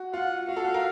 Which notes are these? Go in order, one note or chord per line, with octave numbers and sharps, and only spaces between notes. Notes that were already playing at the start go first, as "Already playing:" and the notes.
Already playing: F#4
F4 F#5
F#4 F5
A4
F#4
A#4